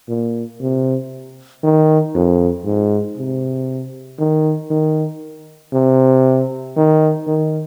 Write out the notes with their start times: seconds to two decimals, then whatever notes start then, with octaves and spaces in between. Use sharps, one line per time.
0.09 A#2
0.61 C3
1.64 D#3
2.15 F2
2.65 G#2
3.18 C3
4.19 D#3
4.71 D#3
5.73 C3
6.77 D#3
7.27 D#3